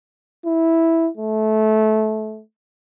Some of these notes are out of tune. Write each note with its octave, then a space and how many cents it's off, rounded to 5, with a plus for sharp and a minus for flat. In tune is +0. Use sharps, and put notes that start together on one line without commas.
E4 -5
A3 -20